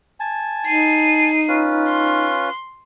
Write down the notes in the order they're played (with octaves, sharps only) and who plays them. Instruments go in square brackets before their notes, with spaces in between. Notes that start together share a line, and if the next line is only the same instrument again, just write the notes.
[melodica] G#5 A5
[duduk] D#4 [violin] C7 D#7
[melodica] C#4 F4 B4
[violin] C6